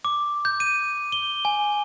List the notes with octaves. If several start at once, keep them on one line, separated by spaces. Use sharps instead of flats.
D6
G6
D#7
G7
G#5